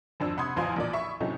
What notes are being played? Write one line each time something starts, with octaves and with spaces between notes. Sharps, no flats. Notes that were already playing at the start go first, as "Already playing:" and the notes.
G#1 F2 D4 E6
C3 F#5 B5 C6 D#6 G#6
A1 E2 F3 F5 G#5 C6
A1 A#2 D5
E5 B5 C#6
A2 C3 F#3 A3 C#4 D#4